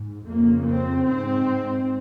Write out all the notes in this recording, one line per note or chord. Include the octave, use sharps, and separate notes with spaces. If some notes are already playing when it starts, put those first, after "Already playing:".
Already playing: G#2
F2 C#3 A#3
C4
G#2 C4